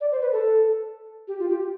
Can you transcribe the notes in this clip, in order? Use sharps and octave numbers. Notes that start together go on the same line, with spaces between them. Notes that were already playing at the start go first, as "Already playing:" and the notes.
D5
C5
B4
A4
G4
F4
G4